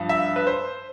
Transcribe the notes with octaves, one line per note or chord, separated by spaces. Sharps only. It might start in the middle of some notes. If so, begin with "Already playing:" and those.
Already playing: G2 F3
E5
B4
C5